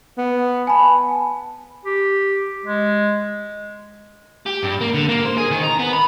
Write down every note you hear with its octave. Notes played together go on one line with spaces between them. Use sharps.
B3
G#5 A5 B5
G4
G#3
G4
G2
A#3
D3
A#3
C5
G#4
D#3
A#5
B3
B5